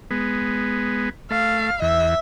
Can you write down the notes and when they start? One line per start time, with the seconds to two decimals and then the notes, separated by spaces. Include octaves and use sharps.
0.11 G#3 B3
1.31 A3 F5
1.82 E2 E5